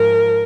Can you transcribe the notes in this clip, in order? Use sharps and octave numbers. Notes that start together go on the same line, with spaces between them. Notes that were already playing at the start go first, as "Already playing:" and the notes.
Already playing: G#2 F3 A#4